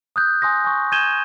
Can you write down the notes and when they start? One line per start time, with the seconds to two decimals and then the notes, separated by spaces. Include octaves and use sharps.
0.16 D#6 F#6 G6
0.42 G#5 C6 D#6 A#6
0.65 G#5 C#6
0.92 G6 G#6 D#7 E7 G7